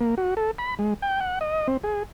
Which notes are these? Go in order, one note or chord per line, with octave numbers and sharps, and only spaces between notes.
A#3
F#4
A4
B5
G#3
G5
F#5
D#5
C4
G#4